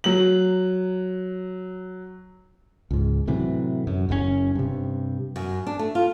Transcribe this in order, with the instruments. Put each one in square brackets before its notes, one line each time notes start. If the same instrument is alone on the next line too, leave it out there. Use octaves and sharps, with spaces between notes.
[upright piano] F#3 F#7
[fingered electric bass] C#2 G#2
A2 C3 E3 F#3
F#2
F#1 F#2 A#2 C#4
G2 C3
[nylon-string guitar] F#2
D4
A3
F4